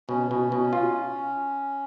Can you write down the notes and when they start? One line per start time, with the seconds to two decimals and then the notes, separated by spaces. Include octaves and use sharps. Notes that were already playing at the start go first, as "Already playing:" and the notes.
0.09 B2 C#4
0.31 B2
0.52 B2
0.73 F4